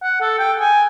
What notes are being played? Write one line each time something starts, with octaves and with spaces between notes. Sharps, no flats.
F#5
A4
G5
G#5